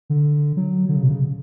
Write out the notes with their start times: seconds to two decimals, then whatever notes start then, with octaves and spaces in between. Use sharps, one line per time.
0.10 D3
0.57 F#3
0.89 D3
0.96 C#3
1.03 B2
1.09 C#3